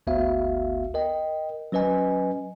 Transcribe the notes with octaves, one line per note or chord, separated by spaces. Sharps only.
G1 D2 B3 F#4 E5 F5
A#4 D#5 G5
F#3 C#4 B4 D#5 G#5